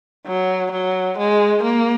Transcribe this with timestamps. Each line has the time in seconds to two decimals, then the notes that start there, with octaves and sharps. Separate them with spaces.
0.26 F#3
0.72 F#3
1.18 G#3
1.63 A#3